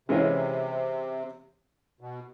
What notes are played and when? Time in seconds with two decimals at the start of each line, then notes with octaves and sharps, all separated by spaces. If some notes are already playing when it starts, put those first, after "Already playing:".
0.08 C3 E3 G#3 C#4 F4
2.01 B2